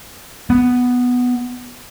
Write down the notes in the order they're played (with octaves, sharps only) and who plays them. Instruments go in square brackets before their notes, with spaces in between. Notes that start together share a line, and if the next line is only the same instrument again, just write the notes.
[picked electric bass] B3